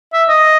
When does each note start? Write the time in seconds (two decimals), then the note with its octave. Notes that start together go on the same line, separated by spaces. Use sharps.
0.13 E5
0.28 D#5